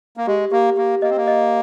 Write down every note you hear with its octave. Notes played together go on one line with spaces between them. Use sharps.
A#3
G#3 G4
A#3 G4
A#3 G4
A#3 D#5
C4
A#3
D#5